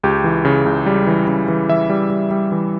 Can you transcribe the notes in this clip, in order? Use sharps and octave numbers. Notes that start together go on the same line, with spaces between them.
C#2 G4
E3
C#3
C#2
G3
E3
C#3
E3
E3 E5
G3
G3
G3
E3